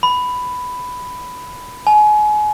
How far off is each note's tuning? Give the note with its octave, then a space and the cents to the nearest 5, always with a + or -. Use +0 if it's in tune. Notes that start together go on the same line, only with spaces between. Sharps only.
B5 +10
G#5 +30